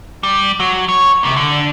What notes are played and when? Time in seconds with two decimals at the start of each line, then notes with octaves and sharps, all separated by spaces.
0.23 G3
0.60 F#3
0.88 C#5
1.23 D#2 C3
1.36 D3